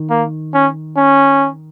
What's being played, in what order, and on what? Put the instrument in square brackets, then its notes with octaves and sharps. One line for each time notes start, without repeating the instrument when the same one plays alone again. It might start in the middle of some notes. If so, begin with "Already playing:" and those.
Already playing: [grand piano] D#3
[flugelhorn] A#3
C#4
C#4